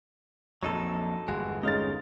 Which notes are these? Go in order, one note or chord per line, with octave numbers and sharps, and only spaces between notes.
A#1 F2 F#3 D#4 A4
G1 E2 G#3 F#4
G#3 C#4 D#4 F5 A6